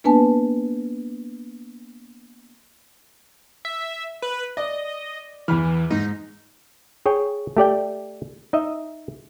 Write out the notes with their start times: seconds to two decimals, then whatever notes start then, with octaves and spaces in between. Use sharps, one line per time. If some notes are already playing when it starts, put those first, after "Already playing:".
0.04 A#3 B3 D4 B4 G#5 A5
3.65 E5
4.22 B4
4.57 D5 D#5
5.48 E2 E3 B5 F6
5.90 G#2 D#4
7.06 G#4 C#5 G5
7.57 A3 G4 D5 G5
8.53 D#4 D#5 E5